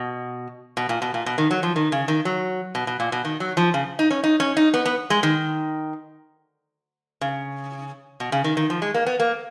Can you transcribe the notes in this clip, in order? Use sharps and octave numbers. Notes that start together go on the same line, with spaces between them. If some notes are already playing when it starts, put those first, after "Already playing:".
Already playing: B2
B2
A#2
B2
A#2
B2
D#3
F#3
F3
D#3
C#3
D#3
F#3
B2
B2
A#2
B2
D#3
F#3
F3
C#3
D#4
C#4
D#4
C#4
D#4
B3
B3
G#3
D#3
C#3
B2
C#3
D#3
D#3
F3
G#3
A#3
B3
A#3